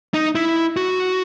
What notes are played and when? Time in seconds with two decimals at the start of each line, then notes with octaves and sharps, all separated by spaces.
0.14 D#4
0.35 E4
0.77 F#4